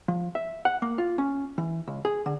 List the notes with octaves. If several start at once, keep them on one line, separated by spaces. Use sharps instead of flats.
F3
E5
F#5
A#3
F4
C#4
E3
C#2
G#4
D3